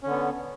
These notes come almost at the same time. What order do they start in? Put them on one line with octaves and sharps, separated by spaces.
C#4 D3 B3